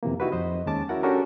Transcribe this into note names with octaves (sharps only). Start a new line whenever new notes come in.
F2 C3 E3 A#3
D#4 E4 F#4 G4 B4
F2 C5 D#5
D#2 G#3 C#4 A5 D6 A6
C#4 E4 F#4 A#4 F#5
C#4 D4 F#4 G4 A4 A#4